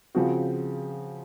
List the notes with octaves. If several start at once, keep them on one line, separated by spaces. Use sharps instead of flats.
C#3 F3 C4 F#4